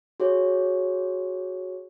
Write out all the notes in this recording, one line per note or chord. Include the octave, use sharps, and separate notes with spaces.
F#4 G#4 C#5